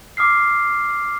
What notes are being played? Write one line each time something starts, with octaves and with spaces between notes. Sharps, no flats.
D6 D#6 F6 C7